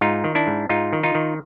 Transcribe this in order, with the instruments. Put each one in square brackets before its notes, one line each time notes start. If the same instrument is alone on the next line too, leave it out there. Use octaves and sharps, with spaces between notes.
[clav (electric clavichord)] G#2 D#4 F4
D#3
D4 E4
G#2
G#2 D#4 F4
D#3
D#4 F4
D#3